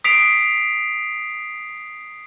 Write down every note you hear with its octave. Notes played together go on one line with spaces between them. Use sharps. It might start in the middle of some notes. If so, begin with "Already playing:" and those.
D#6 B6 C7 D7 F7